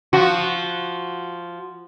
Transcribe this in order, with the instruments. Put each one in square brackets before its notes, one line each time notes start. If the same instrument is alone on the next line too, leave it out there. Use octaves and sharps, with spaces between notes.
[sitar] F3 F#4